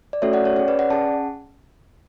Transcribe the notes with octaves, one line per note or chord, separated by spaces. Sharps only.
D5
A3 C#4 F#4 A4 C#5 E5
D5 F#5
C#5
C#4 G#4 C#5
B4 D5
D5 F#5
C#4 G#4 F#5 A5